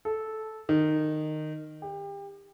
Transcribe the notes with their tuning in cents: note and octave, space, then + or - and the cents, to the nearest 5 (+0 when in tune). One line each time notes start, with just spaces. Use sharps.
A4 -10
D#3 -15
G4 +30